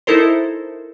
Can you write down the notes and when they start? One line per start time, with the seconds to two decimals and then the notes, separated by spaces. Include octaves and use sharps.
0.07 D#4 E4 A4 A#4 C5